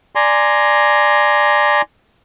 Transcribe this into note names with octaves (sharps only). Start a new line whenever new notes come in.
D5 G#5 A#5 C6